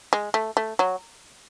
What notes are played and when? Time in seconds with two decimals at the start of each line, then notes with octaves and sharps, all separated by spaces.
0.13 G#3
0.34 A3
0.57 A3
0.79 F#3